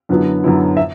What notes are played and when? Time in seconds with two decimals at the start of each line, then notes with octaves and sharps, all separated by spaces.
0.09 F#2 D3 F#3 B3 E4
0.44 F#2 D3 F#3 B3 E4
0.77 E5